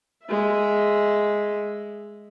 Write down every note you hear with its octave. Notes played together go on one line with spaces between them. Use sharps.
G#3 E5